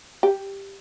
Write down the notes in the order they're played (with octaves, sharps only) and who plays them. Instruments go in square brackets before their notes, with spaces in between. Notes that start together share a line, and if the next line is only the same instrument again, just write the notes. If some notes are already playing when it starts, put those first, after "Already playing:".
[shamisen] G4